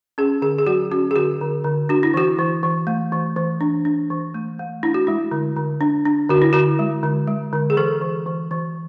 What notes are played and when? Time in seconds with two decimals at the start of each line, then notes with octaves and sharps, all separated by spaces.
0.18 C#4 G#4
0.42 D3 G#4
0.58 G#4
0.67 F#3 F#4
0.91 C#4 F#4
1.11 G#4
1.16 D3 F#4
1.41 D3
1.64 D3
1.89 D4 F#4
2.03 E4
2.14 E3 F#4
2.39 E3
2.63 E3
2.87 A3
3.12 E3
3.36 E3
3.61 D4
3.85 D4
4.10 E3
4.34 A3
4.59 A3
4.83 D4 E4
4.94 F#4
5.07 G#3 E4
5.31 D3
5.56 D3
5.81 D4
6.05 D4
6.29 D3 F#4
6.42 E4
6.53 D3 F#4
6.79 G#3
7.03 D3
7.27 G#3
7.53 D3
7.70 G#4
7.77 E3 A4
8.01 E3
8.26 E3
8.51 E3